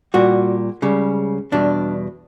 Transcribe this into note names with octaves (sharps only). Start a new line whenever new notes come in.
A#2 G3 F#4
C#2 C#3 G3
E2 B2 G3 D4